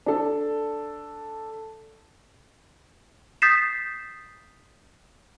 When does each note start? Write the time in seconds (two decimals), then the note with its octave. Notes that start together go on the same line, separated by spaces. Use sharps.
0.06 D4 A4
3.42 D#6 G6 A6 B6 C7 E7